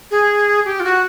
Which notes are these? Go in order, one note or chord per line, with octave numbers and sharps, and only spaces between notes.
G#4
G4
F4
F#4